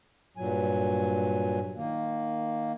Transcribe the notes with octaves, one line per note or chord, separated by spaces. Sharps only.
G2 A#2 F#3 G#5
D#3 A#3